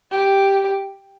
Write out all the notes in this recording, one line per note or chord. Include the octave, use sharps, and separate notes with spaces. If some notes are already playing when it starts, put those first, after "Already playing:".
G4